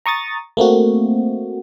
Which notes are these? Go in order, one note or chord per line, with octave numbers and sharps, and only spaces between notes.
A#5 C#6 D#6 A6
A3 A#3 C4 F#4